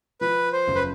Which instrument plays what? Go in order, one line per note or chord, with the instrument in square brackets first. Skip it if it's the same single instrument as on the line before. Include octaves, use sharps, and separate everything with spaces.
[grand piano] F3 [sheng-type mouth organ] B4
[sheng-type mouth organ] C5
[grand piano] F#1
[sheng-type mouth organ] B4